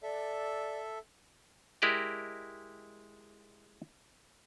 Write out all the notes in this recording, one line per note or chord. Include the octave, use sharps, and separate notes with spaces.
A4 D5 E5
G#3 E4 G4 A#4 D5 D#5